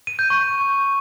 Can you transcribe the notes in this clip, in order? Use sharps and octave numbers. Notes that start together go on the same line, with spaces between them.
D#7
G6
C#6